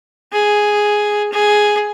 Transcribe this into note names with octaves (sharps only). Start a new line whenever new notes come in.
G#4
G#4